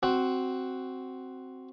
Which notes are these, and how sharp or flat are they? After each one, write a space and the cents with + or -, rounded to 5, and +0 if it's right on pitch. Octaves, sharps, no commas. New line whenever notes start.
C4 +0 F#4 +5